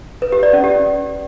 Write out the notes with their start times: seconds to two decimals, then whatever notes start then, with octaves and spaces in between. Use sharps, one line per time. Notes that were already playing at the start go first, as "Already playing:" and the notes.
0.22 B4
0.32 G4
0.43 D5
0.53 C#4
0.64 G4